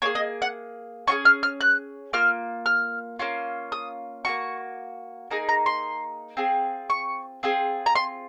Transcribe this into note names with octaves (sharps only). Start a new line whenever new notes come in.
A#3 F4 G#4 C#5
D#5
F#5
C#4 F4 G#4 C#6
F6
F6
F#6
A#3 F4 F6
F6
A#3 C#4 F4
D#6
A#3 C#4 F#4 C#6
A#3 D#4 G#4 A#5
A#5
C6
C4 F4 G#4
C#6
C4 F4 G#4
A#5
C6